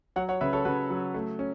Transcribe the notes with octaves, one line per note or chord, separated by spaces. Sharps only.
F#3 C#5 F#5
C#5 F#5
C#3 B4 E5
A4 C#5
C#3 F#4 B4
F#3
A3
C#4